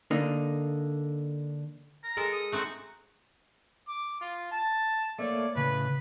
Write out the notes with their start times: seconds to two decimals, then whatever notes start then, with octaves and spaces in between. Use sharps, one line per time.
0.11 D3 A#3 D#4
2.04 A#5
2.17 G#3 A4 A#4
2.32 D#6
2.52 A3 C4 D#4 F#4
3.88 D6
4.21 F4
4.52 A5
5.19 A3 A#3 C#5 D5
5.56 A2 C#3 B4